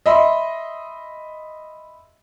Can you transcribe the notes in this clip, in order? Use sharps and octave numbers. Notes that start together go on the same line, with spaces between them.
D#5 E5 B5 C6